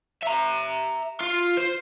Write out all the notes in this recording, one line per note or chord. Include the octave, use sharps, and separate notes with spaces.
E5 A#5
F4
C5